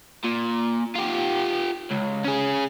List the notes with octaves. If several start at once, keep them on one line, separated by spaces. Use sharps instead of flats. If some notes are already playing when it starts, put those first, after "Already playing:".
A#2
F4 G4
C#2
C#4 G#4